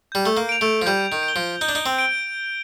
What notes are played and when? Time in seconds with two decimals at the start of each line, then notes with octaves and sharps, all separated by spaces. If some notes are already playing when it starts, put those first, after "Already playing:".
0.12 G3 G6
0.26 A3
0.37 A#3
0.49 D7 F7
0.61 A3
0.82 F3
0.86 G3 G6
1.12 D#3
1.23 D7
1.28 G7
1.36 F3
1.61 D#4 G6
1.69 D4
1.75 D#4
1.86 C4
1.99 D7 G7